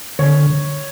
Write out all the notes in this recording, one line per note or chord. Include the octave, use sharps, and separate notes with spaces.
D3 C#5